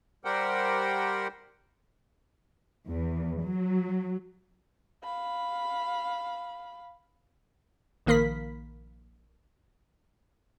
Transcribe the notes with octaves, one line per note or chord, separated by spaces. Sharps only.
G3 G4 A#4 C5 F#5 G5
E2
F#3
F5 B5
A#1 D#3 A#3 A#4 B5 B6